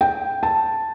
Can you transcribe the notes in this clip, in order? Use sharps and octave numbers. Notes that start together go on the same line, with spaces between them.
G5
A5